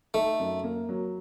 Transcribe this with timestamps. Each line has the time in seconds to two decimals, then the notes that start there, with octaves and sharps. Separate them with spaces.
0.14 A3 D#4
0.40 F#2
0.64 A#3
0.89 F#3